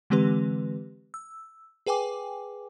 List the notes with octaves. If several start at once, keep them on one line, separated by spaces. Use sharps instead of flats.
D3 E3 G#3 C4 G4 B4
E6
G#4 B4 G5 G#5 D6